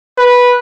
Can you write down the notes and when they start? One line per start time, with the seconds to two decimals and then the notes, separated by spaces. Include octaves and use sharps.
0.18 B4